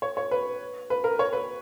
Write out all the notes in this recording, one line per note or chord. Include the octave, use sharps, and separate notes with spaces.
C#5
C#5
B4
B4
A#4
C#5
B4